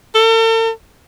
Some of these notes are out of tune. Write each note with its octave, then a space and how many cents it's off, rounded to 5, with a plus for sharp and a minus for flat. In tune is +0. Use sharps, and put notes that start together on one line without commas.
A4 +45